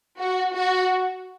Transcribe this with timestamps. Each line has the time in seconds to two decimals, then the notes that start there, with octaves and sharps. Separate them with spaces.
0.19 F#4
0.55 F#4